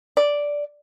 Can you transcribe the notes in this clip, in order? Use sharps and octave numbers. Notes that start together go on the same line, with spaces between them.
D5